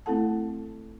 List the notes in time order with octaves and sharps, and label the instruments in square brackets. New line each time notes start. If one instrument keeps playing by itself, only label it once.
[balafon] A3 C4 E4 A4 F#5 A5